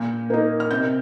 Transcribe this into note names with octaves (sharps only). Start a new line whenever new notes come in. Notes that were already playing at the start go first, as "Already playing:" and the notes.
Already playing: A#2 G6
A#3 D#4
F6
C3 G6